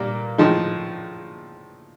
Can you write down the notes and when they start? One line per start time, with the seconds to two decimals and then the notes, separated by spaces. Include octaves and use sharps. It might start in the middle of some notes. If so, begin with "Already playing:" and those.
Already playing: A#2 G3 A#3 D4
0.38 A2 F3 G#3 D#4